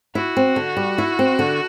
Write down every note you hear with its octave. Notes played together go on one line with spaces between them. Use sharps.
E4 F#4
C4
D3
G3
E4
C4
D3